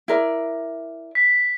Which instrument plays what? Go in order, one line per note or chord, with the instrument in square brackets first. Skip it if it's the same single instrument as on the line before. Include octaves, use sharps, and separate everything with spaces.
[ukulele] E4 A#4 D5
[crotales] B6